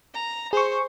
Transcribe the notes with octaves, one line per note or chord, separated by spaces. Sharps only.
A#5
G#4 C5 C#6